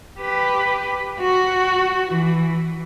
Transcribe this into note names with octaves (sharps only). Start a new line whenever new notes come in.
G4 B4
F#4
E3